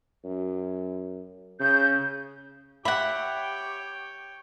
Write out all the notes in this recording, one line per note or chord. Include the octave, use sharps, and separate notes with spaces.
F#2
C#3 G6
G4 C#5 E5 F#5 G5 B5